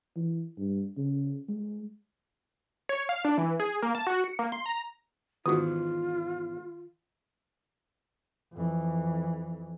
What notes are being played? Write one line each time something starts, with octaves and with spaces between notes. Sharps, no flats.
E3
G2
C#3
G#3
C#5
F5
D4
E3
G#4
A#3
A5
F#4
C#7
A#3
C6
A#5
E2 G#2 D#3 F4 F#4 D#6
F2 E3